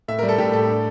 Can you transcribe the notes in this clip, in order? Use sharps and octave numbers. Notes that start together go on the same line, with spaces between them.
A2 E5
G3 A#4
A4
A2 G4
A2 A4
D4